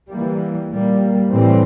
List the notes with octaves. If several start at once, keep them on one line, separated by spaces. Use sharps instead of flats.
E3 G3 A#3
A#2 G3 A#3
A2 E3 G3 C4